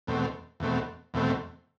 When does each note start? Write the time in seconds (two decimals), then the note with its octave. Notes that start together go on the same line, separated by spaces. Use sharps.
0.07 E2 B2 A3 C4
0.60 E2 B2 A3 C4
1.14 E2 B2 A3 C4